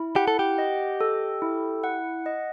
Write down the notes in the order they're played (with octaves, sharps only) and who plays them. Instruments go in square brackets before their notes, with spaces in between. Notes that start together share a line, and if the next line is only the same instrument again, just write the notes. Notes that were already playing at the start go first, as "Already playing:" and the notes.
Already playing: [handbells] E4
[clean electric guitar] G4 [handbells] F#5
[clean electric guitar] A4
G4
[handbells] D#5
A4
E4
F#5
D#5